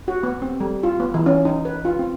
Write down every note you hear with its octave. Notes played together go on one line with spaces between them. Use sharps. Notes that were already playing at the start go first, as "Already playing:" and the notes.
F#4
B3
C4
G3
F4
B3
E3
C#4
D#4
B4
F4
C4